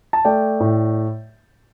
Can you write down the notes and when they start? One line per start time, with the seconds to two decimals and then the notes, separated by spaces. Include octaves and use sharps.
0.13 A5
0.25 A3 D5 G5
0.60 A2